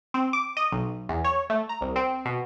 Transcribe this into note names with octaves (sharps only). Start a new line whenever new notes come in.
C4
D6
D#5
B1
E2
C#5
A3
A#5
C2
C4
B2